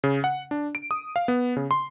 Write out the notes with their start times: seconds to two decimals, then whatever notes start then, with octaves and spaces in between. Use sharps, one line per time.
0.04 C#3
0.24 F#5
0.51 D4
0.75 D7
0.91 D#6
1.16 F5
1.28 B3
1.57 C#3
1.71 C6